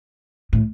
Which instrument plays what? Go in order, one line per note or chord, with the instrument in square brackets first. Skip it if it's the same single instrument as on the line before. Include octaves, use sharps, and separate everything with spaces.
[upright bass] A2